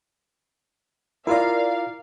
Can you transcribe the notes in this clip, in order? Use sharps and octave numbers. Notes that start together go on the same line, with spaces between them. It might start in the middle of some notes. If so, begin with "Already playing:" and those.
E4 F4 A#4 D5 F5 A#5